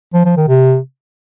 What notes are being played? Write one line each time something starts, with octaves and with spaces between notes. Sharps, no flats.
F3
F3
D#3
C3